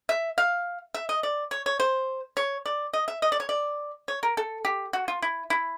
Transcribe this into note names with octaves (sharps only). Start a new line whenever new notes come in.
E5
F5
E5
D#5
D5
C#5
C#5
C5
C#5
D5
D#5
E5
D#5
D5
C#5
D5
C#5
A#4
A4
G4
F#4
F4
E4
E4